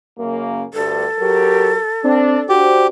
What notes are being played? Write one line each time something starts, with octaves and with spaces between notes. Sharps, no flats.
F#2 C#3 A#3
D2 G2 A4
F#3 G4 A#4
C4 D4
D4 F#4 G4 C5